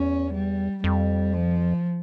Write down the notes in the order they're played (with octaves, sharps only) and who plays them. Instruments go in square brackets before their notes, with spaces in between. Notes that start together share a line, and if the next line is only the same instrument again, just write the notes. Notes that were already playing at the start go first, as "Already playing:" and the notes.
Already playing: [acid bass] E2 [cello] C#4
[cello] G3
[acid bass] F2 [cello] G3
[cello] F3